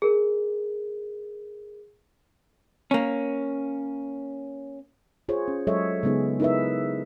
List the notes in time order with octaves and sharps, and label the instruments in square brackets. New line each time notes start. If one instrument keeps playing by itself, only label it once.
[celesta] G#4 A#4
[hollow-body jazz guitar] A#3 C#4
[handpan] F4 G#4 C5 C#5
C#4
F#3 G#3 A4 C#5 D#5 E5
C#3 G#3 B3 D#4 G#4
D#4 E4 A#4 B4 E5